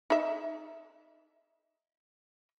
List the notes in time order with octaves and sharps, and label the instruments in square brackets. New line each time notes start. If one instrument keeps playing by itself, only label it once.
[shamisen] D#4 E5